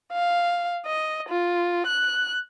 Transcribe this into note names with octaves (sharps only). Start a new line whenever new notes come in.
F5
D#5
F4
F#6